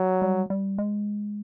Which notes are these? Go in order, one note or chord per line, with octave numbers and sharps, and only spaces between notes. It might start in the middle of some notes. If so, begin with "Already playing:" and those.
Already playing: F#3
G3
G3
G#3